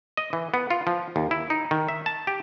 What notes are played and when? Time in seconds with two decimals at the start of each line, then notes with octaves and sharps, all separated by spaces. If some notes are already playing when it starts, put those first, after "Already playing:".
0.17 D#5
0.33 E3
0.54 B3
0.70 F4
0.87 F3
1.16 D#2
1.31 E4
1.50 D#4
1.71 D#3
1.88 E5
2.06 A5
2.27 G4